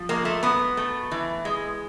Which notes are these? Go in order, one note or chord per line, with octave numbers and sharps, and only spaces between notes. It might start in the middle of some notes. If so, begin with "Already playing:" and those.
Already playing: F3
G#3 A#3
A3
F#3 B3
A3
E3
G#3